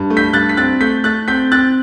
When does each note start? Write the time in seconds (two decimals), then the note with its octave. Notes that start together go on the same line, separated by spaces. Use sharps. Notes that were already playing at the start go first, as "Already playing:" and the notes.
Already playing: G2
0.10 A3
0.17 G6 B6
0.33 G2 F#6 A6
0.49 B6
0.57 C4 F#6 A6
0.81 A3 G6 B6
1.04 A3 F#6 A6
1.28 C4 G6 B6
1.52 C4 F#6 A6